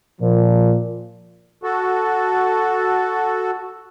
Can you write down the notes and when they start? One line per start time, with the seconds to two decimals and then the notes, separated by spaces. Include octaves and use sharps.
0.21 A#2 F3
1.63 F#4 A4